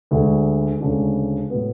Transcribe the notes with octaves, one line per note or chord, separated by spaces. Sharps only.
D2 D3 G#3
D2 C#3 G#3 D4
A2 F#3 B3